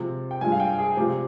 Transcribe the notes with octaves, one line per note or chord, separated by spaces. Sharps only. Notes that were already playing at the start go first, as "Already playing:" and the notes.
Already playing: C3 F3 G#3
G5
G2 F3 G#3 G#5
F5
G5
G#4
C3 F3 G#3 G4